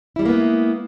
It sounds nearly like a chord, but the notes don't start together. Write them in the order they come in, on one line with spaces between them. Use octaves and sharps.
E4 G3 G#3 A#3 B3